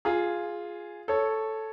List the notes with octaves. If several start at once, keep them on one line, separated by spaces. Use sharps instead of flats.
F4 G#4
A4 C#5